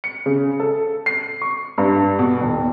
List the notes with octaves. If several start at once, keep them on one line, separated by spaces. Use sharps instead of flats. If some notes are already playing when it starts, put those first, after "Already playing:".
C#7
C#3
A4
C7
C#6
G2
B2
D#1